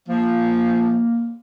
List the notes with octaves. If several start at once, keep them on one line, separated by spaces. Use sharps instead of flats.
F3 A#3